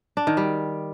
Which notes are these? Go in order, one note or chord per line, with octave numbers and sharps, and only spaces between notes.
D4
D#3
G3